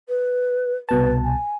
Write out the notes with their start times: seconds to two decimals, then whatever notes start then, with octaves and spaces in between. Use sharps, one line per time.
0.08 B4
0.89 C2 B2 B4 A5
1.24 G#5